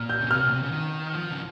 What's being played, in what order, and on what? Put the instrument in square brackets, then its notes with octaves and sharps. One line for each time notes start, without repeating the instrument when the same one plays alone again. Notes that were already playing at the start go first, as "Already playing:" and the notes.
Already playing: [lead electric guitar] A#2 [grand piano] F6
[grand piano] G6
[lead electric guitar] C#3
[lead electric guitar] C3 [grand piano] F6
[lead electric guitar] A#2
C3
C#3
D#3
F3
C#3